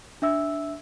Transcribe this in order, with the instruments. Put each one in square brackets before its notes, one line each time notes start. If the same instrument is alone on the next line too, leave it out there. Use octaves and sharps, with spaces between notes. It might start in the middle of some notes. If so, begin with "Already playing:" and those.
[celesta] D4 E5 E6